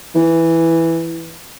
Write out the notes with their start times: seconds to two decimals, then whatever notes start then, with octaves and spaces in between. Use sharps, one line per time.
0.15 E3